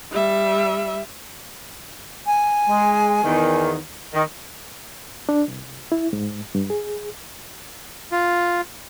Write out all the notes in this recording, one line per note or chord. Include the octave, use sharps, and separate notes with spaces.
G3 E5
G#5
G#3
E2 D#3
D#3 D#5
D4
C2
E4
G#2
G2
G#4
F4